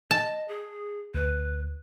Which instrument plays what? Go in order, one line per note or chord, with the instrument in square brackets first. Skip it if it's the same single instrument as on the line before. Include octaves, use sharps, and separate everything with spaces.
[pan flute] D#5 [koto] A5
[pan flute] G#4
[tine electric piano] D2 [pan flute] B4